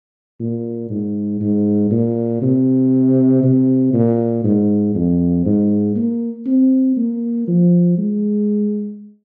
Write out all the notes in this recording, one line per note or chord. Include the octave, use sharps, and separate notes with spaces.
A#2
G#2
G#2
A#2
C3
C3
A#2
G#2
F2
G#2
A#3
C4
A#3
F3
G#3